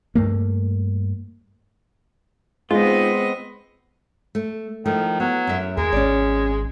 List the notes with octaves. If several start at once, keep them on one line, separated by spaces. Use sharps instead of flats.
G2 A3 A#3
G#3 B3 C4 D#4 F4 D#5
A3
D#3 F3 A3
F#3 B3
F#2 E5
D#2 G#3 A#4
G#1 C#4 D5